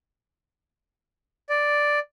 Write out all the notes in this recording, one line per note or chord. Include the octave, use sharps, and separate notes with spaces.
D5